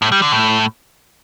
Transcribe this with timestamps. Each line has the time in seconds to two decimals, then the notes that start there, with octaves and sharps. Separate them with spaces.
0.02 A2
0.12 G3
0.22 D3
0.32 A2